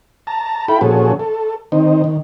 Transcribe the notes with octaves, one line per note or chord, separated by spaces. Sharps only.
A5 A#5
E4 F4 A4 G5 B5
A#2 F3 C#4 F#4 G#4 A4
A4
D#3 C4 D#4
D#3